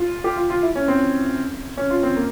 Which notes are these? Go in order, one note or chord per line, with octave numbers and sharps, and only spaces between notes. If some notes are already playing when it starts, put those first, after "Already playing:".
Already playing: F4
G4
F4
F4
E4
C#4
C4
C#4
F4
C4
A#3